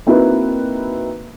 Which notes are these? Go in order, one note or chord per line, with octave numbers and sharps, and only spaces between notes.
A#3 C4 D#4 E4 F#4 B4